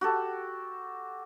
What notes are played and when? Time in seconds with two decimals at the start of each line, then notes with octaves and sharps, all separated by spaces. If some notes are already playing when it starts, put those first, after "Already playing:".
0.01 F#4 G4 A4